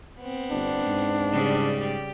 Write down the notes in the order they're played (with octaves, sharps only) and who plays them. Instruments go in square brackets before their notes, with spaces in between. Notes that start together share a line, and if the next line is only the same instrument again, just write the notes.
[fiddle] B3 C4
[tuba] G1 [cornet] D4
[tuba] G#2
[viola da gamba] C#3 G3 D5
[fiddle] G4